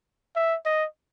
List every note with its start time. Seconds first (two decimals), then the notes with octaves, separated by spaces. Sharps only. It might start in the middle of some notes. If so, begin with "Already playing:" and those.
0.36 E5
0.65 D#5